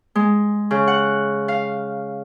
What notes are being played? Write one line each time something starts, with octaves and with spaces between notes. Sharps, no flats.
G#3
C#3
F#5
F5